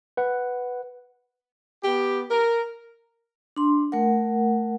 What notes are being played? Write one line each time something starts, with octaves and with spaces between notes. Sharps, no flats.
B4 F#5
B3 G4
A#4
D4 C6
A3 A#4 F#5